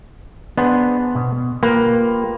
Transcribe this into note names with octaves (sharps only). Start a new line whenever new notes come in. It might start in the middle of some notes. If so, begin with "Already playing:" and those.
B3 D4 G#4 C5
B2
A#3 F4 G4 B4